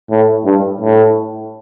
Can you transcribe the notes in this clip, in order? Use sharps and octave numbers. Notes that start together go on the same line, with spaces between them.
A2
G2
A2